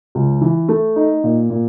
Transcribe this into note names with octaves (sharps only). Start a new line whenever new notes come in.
C#2
E3
A3
D#4
A#2
A#2